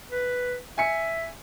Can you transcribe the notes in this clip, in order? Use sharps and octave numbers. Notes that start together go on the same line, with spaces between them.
B4
E5 G#5 C#7